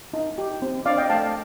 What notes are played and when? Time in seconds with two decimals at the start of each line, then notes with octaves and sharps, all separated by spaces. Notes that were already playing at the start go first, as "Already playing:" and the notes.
0.13 D#4
0.38 G4
0.62 C4
0.86 D4 D5 F5
0.97 D#5 G5
1.10 A3 F5 A5